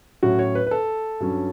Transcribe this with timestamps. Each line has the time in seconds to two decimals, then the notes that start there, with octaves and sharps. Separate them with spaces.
0.23 A2 F#3 C#4 F#4
0.39 C#5
0.55 B4
0.67 B4
0.71 A4
1.20 G2 F#3 C#4